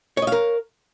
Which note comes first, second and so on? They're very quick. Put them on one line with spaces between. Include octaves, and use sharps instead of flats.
C#5 D#5 F5 A#4